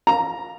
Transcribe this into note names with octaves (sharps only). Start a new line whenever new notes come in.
A#5